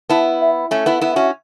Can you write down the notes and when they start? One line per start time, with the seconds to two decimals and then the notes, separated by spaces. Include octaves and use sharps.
0.09 B3 E4 A5
0.41 E5
0.71 A3 C#4 E5
0.86 B3 E4 E5
0.99 B3 E4 F#5
1.12 C#4 F#4 E5